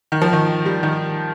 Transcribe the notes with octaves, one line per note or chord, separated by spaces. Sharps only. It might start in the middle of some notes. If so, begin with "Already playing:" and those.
D#3
F3
D#3
G3
D#3